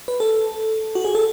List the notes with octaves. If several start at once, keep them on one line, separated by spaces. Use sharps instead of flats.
B4
A4
F#4
G#4
A4